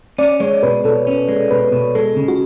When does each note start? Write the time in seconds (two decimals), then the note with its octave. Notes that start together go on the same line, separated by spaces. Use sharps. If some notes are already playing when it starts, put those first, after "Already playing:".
0.18 C#4 D5
0.40 G#3 C#5
0.63 B2 B4
0.84 B2 A4
1.07 C#4
1.29 G#3
1.51 B2 B4
1.72 B2
1.95 G#3 A4
2.16 C#3
2.28 F#4